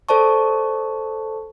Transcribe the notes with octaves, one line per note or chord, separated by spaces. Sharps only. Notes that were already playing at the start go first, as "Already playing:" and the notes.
A4 C5 D5 A5 C#6